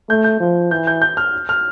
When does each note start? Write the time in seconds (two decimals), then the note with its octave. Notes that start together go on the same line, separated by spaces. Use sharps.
0.09 A3 G6
0.24 G6
0.40 F3
0.71 E3 G6
0.87 G6
1.02 G6
1.17 F6
1.49 F6